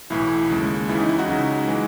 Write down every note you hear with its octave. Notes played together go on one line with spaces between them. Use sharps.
B1 A2 E3 E4
D#2 C#3 G#3
C#2 C#3 E3 E4
D#4
E4
D#4 F#4
C#2 C#3 F#3
E3 G#3